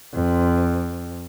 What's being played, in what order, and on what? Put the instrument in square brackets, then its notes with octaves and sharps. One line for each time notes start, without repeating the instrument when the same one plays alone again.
[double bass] F2